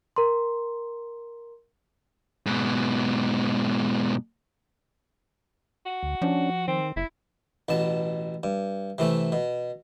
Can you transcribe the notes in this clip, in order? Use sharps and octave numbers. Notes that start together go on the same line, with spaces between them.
A#4 A#5 C6
G#2 B2
F#4
D2
F3 C#4 D4
D#3 C4
F#1 E4
A1 B2 A5
G2
C3 E3 A3
B2